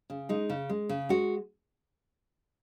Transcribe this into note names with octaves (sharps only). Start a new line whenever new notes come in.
C#3
G#3 D#4
C#3
G#3
C#3
G#3 F#4